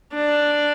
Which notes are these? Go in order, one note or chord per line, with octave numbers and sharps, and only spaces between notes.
D4